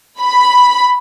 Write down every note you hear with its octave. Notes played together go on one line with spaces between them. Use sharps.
B5